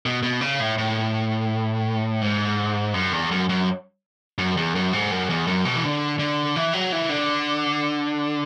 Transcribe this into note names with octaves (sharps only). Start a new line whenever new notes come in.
B2
B2
C#3
A2
A2
G#2
F#2
E2
F#2
F#2
F#2
E2
F#2
G#2
F#2
E2
F#2
B2
E3
D3
D3
E3
F#3
E3
D3